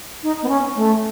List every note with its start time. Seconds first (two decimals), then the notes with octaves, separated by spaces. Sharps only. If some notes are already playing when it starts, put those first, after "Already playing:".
0.23 D#4
0.43 B3
0.49 C#4
0.76 A3